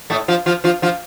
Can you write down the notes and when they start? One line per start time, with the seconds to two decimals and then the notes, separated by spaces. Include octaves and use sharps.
0.10 A2 A3
0.28 F3 F4
0.46 F3 F4
0.64 F3 F4
0.82 F3 F4